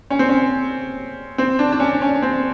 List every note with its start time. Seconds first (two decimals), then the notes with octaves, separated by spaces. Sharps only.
0.10 C#4
0.19 C4
0.29 C#4
1.38 C4
1.59 D4
1.73 D4
1.80 C#4
2.02 C#4
2.22 C4